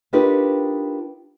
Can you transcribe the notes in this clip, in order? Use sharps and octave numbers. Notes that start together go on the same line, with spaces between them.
D4 D#4 F4 G4 A#4 B4